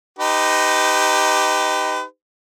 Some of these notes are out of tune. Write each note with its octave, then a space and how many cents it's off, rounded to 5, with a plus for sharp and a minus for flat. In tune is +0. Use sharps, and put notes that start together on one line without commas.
D#4 +0 G4 +0 B4 +35